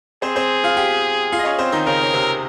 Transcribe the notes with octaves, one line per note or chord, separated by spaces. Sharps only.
C4 G#4 C5
C4 C5
F4 F5
G4 G5
F4 F5
D#5
C#4 C#5
C4 C5
D#3 D#4
C#3 C#4 A#4
C#4
C3 C4